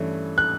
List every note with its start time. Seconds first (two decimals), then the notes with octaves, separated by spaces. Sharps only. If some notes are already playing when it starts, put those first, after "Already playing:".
Already playing: G2 E3 A3 C#4
0.38 F#6